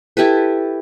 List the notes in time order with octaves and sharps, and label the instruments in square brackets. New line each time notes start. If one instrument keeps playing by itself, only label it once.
[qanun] E4 G4 A4 B4